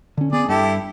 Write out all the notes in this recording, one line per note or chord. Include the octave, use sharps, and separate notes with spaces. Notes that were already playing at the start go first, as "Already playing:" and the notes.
D3 C#4
B3 G#4 D5
G2 E4 G4 A4